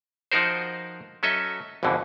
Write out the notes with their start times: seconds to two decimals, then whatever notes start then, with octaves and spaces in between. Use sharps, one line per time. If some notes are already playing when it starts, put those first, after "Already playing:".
0.32 F3 D#4 F#4 A#4 C5
1.23 F#3 C#4 A4 D#5 E5
1.83 G#1 F2 B2 D3 E3